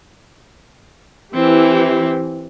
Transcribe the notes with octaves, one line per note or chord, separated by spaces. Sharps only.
E3 C4 E4 G4